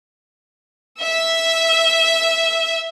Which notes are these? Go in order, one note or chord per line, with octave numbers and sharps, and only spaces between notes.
E5 E6